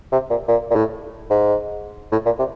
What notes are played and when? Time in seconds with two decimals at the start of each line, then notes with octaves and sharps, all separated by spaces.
0.12 C3
0.30 A#2
0.48 A#2
0.71 A#2
0.76 A2
1.30 G#2
2.12 A2
2.26 A#2
2.39 C3